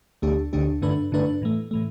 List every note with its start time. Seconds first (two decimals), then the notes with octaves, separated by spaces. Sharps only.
0.22 D2 D3 A3 D4 G4
0.53 D2 D3 A3 D4 G4
0.82 G2 D3 A3 D4 B4
1.12 G2 D3 A3 D4 B4
1.42 A2 E3 A3
1.71 A2 E3 A3